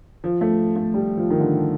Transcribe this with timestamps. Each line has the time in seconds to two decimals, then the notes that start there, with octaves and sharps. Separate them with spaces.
0.24 F3
0.41 A3
0.76 A3
0.94 G3
1.17 F3
1.30 D#3
1.40 D3